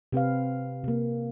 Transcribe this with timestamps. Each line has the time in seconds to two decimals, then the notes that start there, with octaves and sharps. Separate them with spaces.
0.12 C3 C4 B4 F5
0.84 C3 A#3